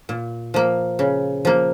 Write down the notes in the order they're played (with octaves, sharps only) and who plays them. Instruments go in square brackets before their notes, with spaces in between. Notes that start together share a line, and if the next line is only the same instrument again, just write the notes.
[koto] A#2
F3 A#3
C#3
F3 A#3